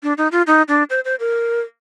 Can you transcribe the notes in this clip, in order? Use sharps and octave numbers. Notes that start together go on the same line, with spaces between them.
D4
D#4
F4
D#4
D4
C5
C5
A#4